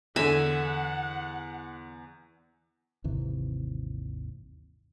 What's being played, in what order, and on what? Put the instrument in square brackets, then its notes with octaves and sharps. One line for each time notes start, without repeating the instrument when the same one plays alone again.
[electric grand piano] E2 [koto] D3 A#5 [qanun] E5 G#5 [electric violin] F#5
[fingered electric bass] G#1 D#2 C3 E3